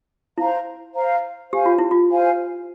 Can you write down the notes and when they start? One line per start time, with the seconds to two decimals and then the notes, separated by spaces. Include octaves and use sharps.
0.37 E4 C5 F5 A#5
0.94 C5 F5 A#5
1.52 G4 C5 F5 G#5
1.66 F4
1.78 E4
1.91 F4
2.10 C5 F5 G#5